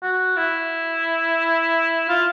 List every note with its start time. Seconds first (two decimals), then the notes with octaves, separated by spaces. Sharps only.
0.02 F#4
0.37 E4
2.09 F4